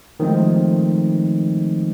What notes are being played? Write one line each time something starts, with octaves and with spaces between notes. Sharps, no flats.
D#3 F3 G#3 A3 C4 D#4